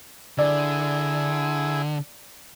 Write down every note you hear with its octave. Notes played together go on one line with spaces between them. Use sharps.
D3 E4 G#4 D5